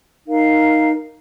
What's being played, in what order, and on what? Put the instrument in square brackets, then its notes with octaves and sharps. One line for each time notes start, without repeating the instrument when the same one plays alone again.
[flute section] D#4 A#4 F5